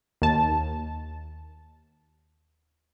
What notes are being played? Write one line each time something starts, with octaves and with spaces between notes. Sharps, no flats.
D#2 A5